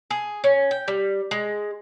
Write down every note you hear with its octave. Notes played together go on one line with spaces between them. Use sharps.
G#4
C#4
G5
G3
G#3